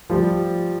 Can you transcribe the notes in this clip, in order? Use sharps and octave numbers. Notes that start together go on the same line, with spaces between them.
F3 G3